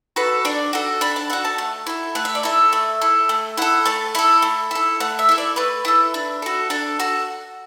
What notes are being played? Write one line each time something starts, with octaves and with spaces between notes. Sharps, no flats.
F#4 A4 B4
D4 D5
F#4 A4
D4 B5
A5
F#4 A4 F#5
A5
A3
E4 A4
A3 F#5
E5
D5
E4 A4 E5
A3
E4 A4
A3
E4 A4 F#5
A3 A5
E4 A4 B5
A3
E4 A4
A3 F#5
E5
E4 A4
D5
A3 B4
E4 A4
D4
F#4 A4
D4 A4
F#4 A4